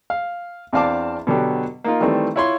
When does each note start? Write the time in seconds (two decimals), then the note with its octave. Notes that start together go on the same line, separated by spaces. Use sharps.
0.10 F5
0.73 E2 C4 D4 F5 A5 D6
1.27 B2 D3 F#3 G4
1.84 A#3 D#4 F4
2.01 D#3 E3 G3 A3 C4
2.36 E4 F4 C#5 B5 C6